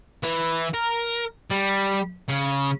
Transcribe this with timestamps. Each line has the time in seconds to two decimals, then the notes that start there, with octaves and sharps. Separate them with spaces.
0.23 E3
0.74 A#4
1.51 G3
2.28 C#3